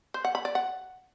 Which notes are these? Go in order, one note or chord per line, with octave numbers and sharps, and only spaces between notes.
C5
F#5
B5
D5
F#5